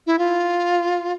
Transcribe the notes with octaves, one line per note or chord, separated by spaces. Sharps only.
E4
F4